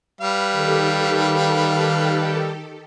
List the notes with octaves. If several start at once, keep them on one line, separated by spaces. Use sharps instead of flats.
G3 B4 F5
D#3 G4 A4